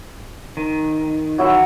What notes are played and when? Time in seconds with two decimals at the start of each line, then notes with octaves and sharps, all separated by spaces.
0.57 D#3
1.38 F#3 E4 E5